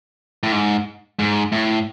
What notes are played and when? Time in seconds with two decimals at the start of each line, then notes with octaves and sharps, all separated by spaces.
0.43 A2
0.52 G#2
1.19 G#2
1.52 A2